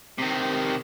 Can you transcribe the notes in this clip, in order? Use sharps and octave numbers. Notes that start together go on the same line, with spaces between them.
C3 D#3